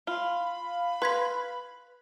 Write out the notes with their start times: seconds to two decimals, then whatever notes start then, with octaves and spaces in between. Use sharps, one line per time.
0.07 F4 F5 B5
1.02 B4 C6 G#6 B6